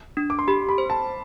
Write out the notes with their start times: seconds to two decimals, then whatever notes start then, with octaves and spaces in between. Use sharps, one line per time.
0.17 D4
0.30 D6
0.39 C6
0.47 G4 B5
0.69 B5
0.78 C5
0.90 A5